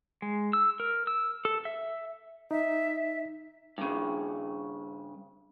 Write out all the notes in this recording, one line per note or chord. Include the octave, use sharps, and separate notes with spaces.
G#3
E6
A#4
E6
A4
E5
D#4 E5
G2 C#3